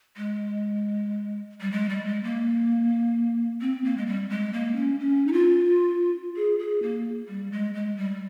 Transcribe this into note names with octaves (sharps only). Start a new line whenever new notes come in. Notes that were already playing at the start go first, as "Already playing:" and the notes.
G#3
G3
G#3
G3
G#3
A#3
C4
A#3
G#3
G3
G#3
A#3
C#4
C#4
D#4
F4
G#4
G#4
A#3
G3
G#3
G#3
G3